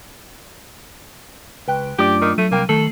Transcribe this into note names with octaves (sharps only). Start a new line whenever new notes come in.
C#2 B4 G5 F#6
F#2 A3 D4 F4 G4 D5
D#3
F#3 A3 D#7
C2 A#3 G5
D#3 A3 A4 C7 F#7